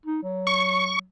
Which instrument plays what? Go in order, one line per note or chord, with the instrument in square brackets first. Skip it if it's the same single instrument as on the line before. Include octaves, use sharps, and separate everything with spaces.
[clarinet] D#4
F#3
[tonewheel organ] C#6